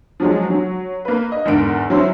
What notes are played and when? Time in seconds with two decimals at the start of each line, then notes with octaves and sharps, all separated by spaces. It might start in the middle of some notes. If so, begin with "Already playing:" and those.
0.20 F3 F#3 G#3
0.50 F#3
1.05 A#3 B4
1.32 D#5
1.45 E2 G#2 D3 A#4 D7
1.90 F#3 C#4 E4 C5 C6